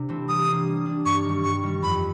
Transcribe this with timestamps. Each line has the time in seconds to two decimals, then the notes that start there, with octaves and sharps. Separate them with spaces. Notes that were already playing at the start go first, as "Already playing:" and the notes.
Already playing: C3 D4 G4
0.09 E3 A3 C4
0.28 G3 D#6
0.48 A#3 D4
0.66 G3
0.86 A#3 D4
1.05 G2 C#6
1.24 D#3 G3
1.43 G2 C#6
1.63 D#3 G3
1.82 F2 B5